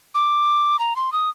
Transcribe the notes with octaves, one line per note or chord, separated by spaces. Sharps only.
D6
A#5
C6
D#6